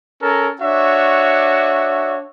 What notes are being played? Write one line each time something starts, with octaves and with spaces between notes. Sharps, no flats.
C#4 A4 A#4
D4 F#4 C#5 E5